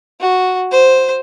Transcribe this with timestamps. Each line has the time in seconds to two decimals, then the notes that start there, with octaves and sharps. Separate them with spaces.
0.20 F#4
0.71 C5